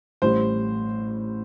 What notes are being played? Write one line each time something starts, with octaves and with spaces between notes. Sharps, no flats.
A1 A2 G3 C5